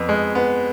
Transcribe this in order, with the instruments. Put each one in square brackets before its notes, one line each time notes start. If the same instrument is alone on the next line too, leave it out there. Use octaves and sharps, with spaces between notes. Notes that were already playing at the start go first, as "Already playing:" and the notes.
Already playing: [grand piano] F2 B3
G#3
B3